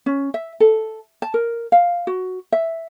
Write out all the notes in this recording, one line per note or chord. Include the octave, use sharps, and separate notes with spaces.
C#4
E5
A4
A5
A#4
F5
F#4
E5